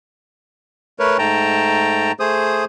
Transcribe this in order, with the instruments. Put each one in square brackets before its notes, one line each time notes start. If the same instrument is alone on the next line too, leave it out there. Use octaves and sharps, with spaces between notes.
[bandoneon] A3 A#4 B4 C#5
G#2 A3 G5 A5 A#5
A3 G#4 C5 D#6